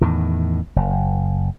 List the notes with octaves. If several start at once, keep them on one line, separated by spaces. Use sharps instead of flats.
E2 A2 D#3
F#1